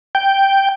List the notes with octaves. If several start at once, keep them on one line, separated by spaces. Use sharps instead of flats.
G5